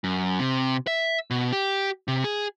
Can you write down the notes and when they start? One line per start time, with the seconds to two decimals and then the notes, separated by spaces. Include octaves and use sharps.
0.04 F#2
0.39 C3
0.87 E5
1.30 B2
1.52 G4
2.08 C3
2.24 G#4